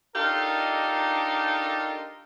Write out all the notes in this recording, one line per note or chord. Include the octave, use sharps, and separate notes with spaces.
D4 D#4 F4 G4 A4 A#4